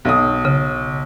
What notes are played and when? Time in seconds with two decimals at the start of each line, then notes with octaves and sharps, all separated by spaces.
0.05 B1 D#6
0.45 C#3